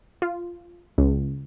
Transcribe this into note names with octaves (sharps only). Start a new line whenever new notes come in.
F4
C#2